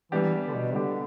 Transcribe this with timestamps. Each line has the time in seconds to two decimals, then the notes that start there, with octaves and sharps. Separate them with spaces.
0.12 E3 G3 B3 D4 G4
0.48 D3
0.54 B2
0.74 D3 G3 B3 D4 G4